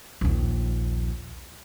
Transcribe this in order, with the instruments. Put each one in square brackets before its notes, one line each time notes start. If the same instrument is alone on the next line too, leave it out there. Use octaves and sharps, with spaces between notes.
[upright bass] A#1 D#2